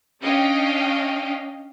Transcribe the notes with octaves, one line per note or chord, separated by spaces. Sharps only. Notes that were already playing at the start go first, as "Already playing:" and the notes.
C#4 D4 D#5 F5 G5